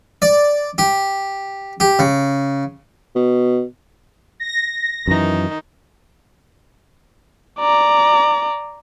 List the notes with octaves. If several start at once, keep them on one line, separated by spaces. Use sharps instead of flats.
D5
G4
G4
C#3
B2
A#6
F#2 D#3 E3 D#4
D5 A#5